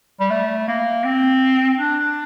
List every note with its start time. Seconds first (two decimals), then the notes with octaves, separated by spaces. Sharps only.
0.20 G3
0.30 A3
0.68 A#3
1.04 C4
1.78 D4